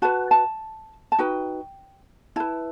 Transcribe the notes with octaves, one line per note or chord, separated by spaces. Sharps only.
F#4 B4 A5
A5
A5
D#4 F#4 B4 G5
E4 B4 A5